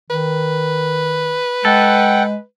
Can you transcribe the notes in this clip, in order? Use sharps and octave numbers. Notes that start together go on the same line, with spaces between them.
D#3 B4
G#3 A4 F#5 G5